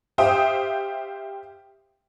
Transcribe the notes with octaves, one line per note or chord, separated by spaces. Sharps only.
G4 C5 E5 F5 G5 D#6